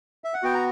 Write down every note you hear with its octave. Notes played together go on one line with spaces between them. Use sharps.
E5
F#5
B3 F#4 G5
A#5